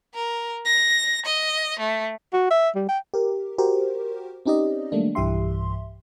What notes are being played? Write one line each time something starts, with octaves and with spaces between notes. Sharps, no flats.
A#4
A#6
D#5
A3
F#4
E5
G3
G5
G4 A#4
F#4 G4 A#4 C5
C4 C#4 D#4 G4 D5 D#5
D#3 F#3 G3 A3 A#3 D4
B1 G2 E3 G4 E5 C6